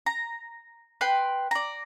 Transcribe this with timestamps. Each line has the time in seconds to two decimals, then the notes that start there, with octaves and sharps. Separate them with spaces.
0.06 A#5
1.01 B4 G5 C6
1.51 D5 A#5